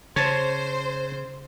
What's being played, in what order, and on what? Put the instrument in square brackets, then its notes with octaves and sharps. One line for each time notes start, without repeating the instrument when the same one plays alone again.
[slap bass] C#3 [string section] C5 [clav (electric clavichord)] C#5 A5